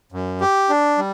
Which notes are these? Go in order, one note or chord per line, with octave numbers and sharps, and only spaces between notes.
F#2
G4
D4
G3